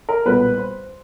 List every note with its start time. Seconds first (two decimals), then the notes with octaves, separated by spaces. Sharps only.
0.09 A#4
0.25 B1 A#2 G3 B3 B4
0.58 C5